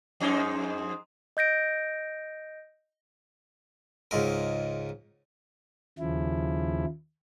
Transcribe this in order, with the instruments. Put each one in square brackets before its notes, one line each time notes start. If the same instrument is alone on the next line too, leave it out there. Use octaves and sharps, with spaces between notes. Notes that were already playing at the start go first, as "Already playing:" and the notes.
[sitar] F2 G#2 D#4
[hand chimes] D#5 G6 A#6 D7
[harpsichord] C#2 G#2 A#4
[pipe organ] D#2 C#3 F3 E4